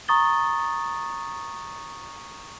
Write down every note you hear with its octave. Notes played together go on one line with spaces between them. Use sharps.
A#5 C#6 D#6 A6 G7